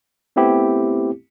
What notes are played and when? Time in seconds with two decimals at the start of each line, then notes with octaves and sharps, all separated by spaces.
0.36 A3 B3 C4 E4 G4